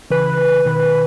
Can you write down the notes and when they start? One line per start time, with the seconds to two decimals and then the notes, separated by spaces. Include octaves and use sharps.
0.11 C#3 E3 B4
0.65 B2 D#3